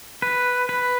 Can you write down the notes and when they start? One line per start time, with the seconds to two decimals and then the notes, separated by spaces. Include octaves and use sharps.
0.22 B4
0.69 B4